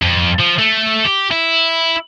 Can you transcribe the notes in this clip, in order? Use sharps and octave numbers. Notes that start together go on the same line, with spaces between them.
F2
F3
A3
G4
E4